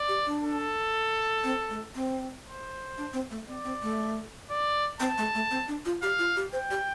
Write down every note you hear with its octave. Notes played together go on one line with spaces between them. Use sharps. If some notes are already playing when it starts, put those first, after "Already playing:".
Already playing: D5
G4
D4
A4
C4
A3
C4
C5
D4
C4
A3
C4 D5
C4
A3
D5
C4 A5
A3
A3
C4
D4
F4
G4 F5
F4
G4
C5 G5
G4